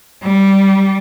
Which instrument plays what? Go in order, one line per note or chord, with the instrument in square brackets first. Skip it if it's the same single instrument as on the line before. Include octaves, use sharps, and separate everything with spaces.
[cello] G3